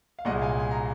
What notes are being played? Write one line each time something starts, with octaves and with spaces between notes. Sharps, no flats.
F5
C2 A#2 G#3 D#5 F#5
F5 G#5
G#5
A#5